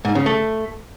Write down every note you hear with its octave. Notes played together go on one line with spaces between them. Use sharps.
G#2
C#3
A3